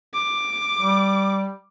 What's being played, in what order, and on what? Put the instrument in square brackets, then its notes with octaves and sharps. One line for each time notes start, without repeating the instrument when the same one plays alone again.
[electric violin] D6
[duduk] G3